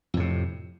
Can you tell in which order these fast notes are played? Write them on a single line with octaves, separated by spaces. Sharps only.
F2 A2 C3